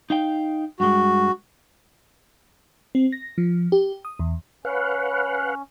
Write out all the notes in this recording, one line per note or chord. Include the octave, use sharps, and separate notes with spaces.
D#4 F5 G5
G2 G#3 F#4
C4
A#6
F3
G4
D#6
E2
C#4 B4 F5 F#5